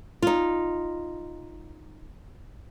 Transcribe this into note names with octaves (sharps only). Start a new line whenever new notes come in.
D#4 F4